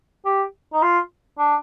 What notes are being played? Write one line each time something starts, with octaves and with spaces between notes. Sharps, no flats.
G4
D#4
F4
D4